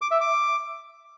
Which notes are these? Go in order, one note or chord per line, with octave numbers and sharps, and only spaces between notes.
D6
E5
D6